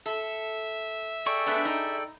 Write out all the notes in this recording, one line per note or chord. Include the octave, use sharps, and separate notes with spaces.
A4 E5
G#4 A4 D5 G5 C#6
A3 B3 D4
D#4